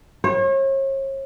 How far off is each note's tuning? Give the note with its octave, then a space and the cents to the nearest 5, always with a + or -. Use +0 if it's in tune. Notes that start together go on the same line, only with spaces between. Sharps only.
C#5 -40